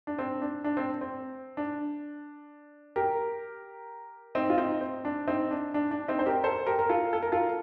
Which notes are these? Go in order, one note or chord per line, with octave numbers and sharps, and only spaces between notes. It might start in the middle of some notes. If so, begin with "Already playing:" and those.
D4
C4
D4
D4
C4
C4
D4
G4 A#4
C4 D#4
F4
C4 D#4
C4
D4
C4 D#4
D4
D4
D4
C4 D#4
C5
G4 A#4
A4 C5
G4 A#4
A#4
F4 A4
A4
A#4
F4 A4